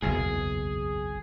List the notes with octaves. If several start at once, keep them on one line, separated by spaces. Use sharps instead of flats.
F#1 B1 E2 G#4